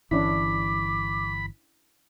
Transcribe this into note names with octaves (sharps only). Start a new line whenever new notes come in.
G1 E3 C#4 D4 E4 B5 D6